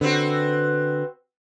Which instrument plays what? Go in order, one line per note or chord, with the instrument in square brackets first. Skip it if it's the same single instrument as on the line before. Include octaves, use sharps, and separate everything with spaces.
[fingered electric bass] D3 [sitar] B3 C4 F#4